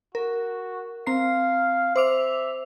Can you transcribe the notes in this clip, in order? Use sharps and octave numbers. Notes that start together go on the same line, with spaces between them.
F#4 A#4
C4 F5 A#5 C7
C5 E5 D6 F7